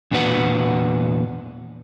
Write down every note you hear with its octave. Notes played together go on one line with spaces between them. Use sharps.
E2 A#2 D4 F#4 B4 F#5